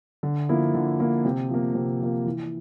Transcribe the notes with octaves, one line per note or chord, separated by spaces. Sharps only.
D3
F3 A#3 E4
D3
F3 A#3 E4
C3
F3 A#3
C3
F3 A#3
E3